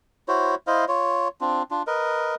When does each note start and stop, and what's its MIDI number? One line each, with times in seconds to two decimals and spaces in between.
0.28 0.55 64
0.28 0.55 66
0.28 0.55 72
0.28 0.55 73
0.67 0.85 64
0.67 0.85 72
0.67 0.85 75
0.67 0.85 77
0.88 1.28 65
0.88 1.28 73
1.41 1.63 60
1.41 1.63 62
1.41 1.63 65
1.71 1.82 62
1.71 1.82 65
1.87 2.35 70
1.87 2.35 71
1.87 2.35 75